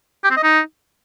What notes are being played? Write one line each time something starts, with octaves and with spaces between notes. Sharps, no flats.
G4
C4
D#5
D#4